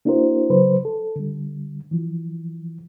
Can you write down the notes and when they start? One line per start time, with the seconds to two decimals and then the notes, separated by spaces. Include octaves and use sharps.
0.05 A#3 D4 E4 F#4 A#4 C5
0.50 C#3 F#3 B4 C5
0.85 A4
1.16 D3 G3
1.91 E3 F3